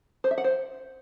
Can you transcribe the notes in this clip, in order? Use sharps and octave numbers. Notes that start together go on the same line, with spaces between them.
C5
E5
F#5
C5